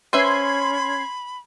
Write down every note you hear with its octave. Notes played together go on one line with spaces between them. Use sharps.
C#4 B4 C5 E5 B5 C6 G#6 C7